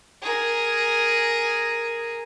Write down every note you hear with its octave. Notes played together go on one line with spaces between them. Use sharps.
G#4 A#4